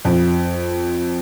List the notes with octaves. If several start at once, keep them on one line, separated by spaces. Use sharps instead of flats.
F2